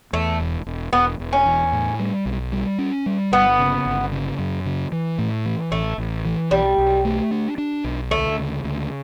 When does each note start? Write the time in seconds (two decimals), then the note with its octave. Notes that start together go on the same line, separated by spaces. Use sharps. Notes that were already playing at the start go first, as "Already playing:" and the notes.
0.13 E2 A3
0.40 E1
0.66 E1
0.93 E1 B3
1.20 E1
1.33 C#4
1.46 E2
1.73 A2
2.00 G3
2.26 B1
2.52 G3
2.79 C#4
3.06 G3
3.32 G1 B3
3.59 C#3
3.86 G1
4.12 C#3
4.39 F#2
4.66 C#3
4.92 E3
5.19 A2
5.45 E3
5.72 A1 A3
5.98 A1
6.25 E3
6.51 B1 G3
6.78 B1
7.05 A3
7.31 D4
7.58 D4
7.84 B1
8.11 D2 A3
8.38 C#3
8.64 D2